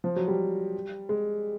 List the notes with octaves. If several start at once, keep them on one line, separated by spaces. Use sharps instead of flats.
F3
F#3
G3
G#3